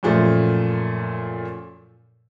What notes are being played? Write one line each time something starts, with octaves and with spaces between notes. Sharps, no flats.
F#2 A#2 F3 A3